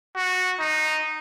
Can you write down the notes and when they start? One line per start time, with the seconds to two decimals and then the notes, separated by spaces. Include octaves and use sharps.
0.16 F#4
0.59 D#4